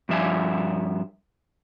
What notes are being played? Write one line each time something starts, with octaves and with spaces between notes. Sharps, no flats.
G2 F3 E5 F5 G#5